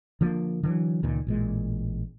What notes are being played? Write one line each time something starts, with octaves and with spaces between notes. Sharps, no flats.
D3 F3 G3 A#3
D3 E3 F#3
C#2 A#2 D#3
A1 A#2 G#3